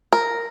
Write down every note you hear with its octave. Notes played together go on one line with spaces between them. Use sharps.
A#4